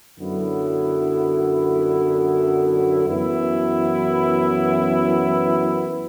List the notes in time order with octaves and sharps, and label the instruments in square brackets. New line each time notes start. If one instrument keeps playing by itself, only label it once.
[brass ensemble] F#2 D3 F#3 B3 E4
F#2 E3 B3 E4